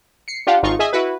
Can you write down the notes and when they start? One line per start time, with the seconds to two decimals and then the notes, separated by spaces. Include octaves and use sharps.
0.28 C7 C#7
0.47 D4 F4 G4 F5 F#5
0.63 G#1 D#4 F4 C#6
0.79 G#4 D#5 E5 G#5 D#6
0.93 E4 F#4 B4